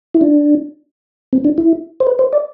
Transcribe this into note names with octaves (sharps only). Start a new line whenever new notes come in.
E4
D4
C4
D4
E4
C5
B4
C5
D5